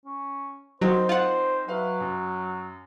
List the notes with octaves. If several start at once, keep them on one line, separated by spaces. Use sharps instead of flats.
C#4
F#3 C4 D#4 A#4 C5
F4 C5 F#5
F#3 B4 E5 F5
F#2